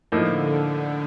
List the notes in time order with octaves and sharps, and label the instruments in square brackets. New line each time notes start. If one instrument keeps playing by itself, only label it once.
[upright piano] A2 F3 A#3 D#4 [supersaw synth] D3